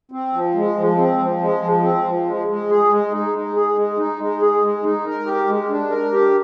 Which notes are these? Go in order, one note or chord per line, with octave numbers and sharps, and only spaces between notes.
C4
F3
G#3
F3
C4
F3
G#3
F3
C4
F3
G#3
G#3
G#4
G#3
D#4
G#3
G#4
G#3
D#4
G#3
G#4
G#3
D#4
A#4
G4
G#3
D4
A#4
G4